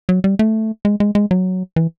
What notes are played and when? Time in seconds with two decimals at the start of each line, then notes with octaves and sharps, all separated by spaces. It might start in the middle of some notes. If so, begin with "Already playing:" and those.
0.09 F#3
0.24 G3
0.39 A3
0.85 G#3
1.00 G#3
1.15 G#3
1.31 F#3
1.76 E3